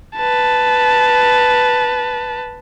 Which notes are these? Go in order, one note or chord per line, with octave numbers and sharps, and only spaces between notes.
B4 A5